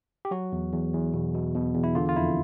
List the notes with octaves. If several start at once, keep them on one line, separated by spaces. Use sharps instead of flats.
G4
F#3 F#4
E2
E2
E2
B2
B2
B2
E2
E4
D3 F4
F4
F2 E4